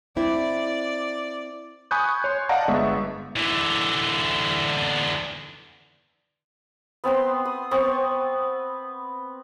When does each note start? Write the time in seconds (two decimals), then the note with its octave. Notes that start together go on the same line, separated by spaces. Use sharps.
0.17 C4 E4 D5
1.91 G#5 B5 C#6 D#6 F#6 G6
2.24 C#5 C6
2.49 D5 D#5 F5 F#5 A5 A#5
2.68 G1 G#3 B3 E5 C#6
3.36 D3 E3
7.04 B3 C4 B5 C6
7.45 D#6
7.71 B3 C4 C#6